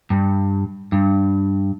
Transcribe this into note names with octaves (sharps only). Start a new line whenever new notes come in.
G2
G2